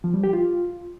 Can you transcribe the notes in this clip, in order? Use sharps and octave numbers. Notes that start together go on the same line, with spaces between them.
F3
G3
G4
F4